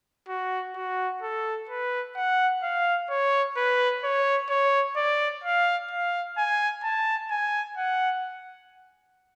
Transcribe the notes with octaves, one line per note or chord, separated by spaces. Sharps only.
F#4
F#4
A4
B4
F#5
F5
C#5
B4
C#5
C#5
D5
F5
F5
G#5
A5
G#5
F#5